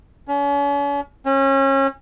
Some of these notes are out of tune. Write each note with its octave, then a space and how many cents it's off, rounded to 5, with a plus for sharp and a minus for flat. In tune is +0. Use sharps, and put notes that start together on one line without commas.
C#4 +40
C#4 -30